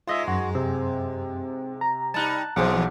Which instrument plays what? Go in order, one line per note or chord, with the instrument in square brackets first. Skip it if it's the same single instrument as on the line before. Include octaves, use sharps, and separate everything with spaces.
[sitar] G#2 G#3 [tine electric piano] F4 D#5 E5
[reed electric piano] F#2 [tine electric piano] F#4
[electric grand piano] C3 [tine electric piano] C4
[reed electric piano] A#5
[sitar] G3 D#4 [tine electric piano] A5 F#6
[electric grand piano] B1 G#4 C5 [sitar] E2 E3 F3 [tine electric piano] F#5 D6